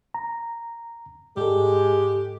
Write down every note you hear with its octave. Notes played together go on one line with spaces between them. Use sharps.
A#5
G#2 G#3 G4 A4